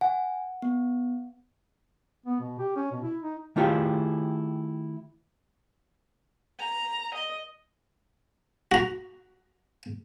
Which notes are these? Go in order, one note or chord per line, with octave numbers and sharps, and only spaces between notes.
F#5 G#5
B3
B3
B2
G4
C#4
B2
E4
D#4
D#3 A3 E4 F4 G4 G#4
A#5
D#5
F#4 A#5